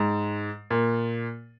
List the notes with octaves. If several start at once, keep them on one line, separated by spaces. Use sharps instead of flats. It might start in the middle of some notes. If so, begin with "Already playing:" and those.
Already playing: G#2
A#2